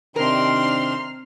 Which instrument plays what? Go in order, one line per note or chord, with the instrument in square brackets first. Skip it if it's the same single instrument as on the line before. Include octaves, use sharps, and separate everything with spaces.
[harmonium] C3 D#3 D4 [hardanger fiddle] C4 C6 [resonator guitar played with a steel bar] A#4 [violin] F6 C7